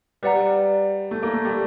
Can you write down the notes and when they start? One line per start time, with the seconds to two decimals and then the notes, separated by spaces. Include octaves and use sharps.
0.23 G3 B4 D5 F#5 A#5
1.11 A3
1.23 A#3
1.34 A3
1.45 G3